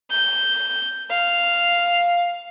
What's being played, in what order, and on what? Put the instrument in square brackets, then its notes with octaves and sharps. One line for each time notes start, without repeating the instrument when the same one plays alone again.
[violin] G6
F5